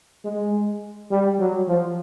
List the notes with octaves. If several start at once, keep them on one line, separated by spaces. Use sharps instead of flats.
G#3
G3
F#3
F3